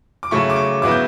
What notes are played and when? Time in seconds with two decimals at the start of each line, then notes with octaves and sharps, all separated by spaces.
0.23 D6
0.31 C#3 F#3 A3 E4 C#6
0.50 D6
0.56 C#6
0.82 C#3 F#3 B3 E4 D6
0.91 G6